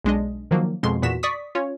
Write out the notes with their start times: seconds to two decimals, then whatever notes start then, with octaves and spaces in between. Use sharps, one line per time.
0.04 B1 G#3 D4 D#5
0.51 D#3 F3 F#3 A#3
0.83 F2 B2 G#3 C6
1.02 E2 A#2 B3 F#4 B6 E7
1.23 D5 C#6 D#6 B6
1.55 C#4 F4 C#5